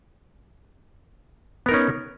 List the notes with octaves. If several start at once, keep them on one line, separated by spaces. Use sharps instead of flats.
B3 C#4 D#4 A#4